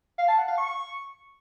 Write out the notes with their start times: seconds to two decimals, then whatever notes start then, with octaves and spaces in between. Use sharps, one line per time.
0.18 F5
0.28 A5
0.38 F#5
0.48 F5
0.58 C#6